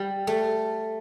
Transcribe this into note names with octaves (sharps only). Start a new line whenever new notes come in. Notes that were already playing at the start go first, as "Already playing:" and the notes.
Already playing: G3
A3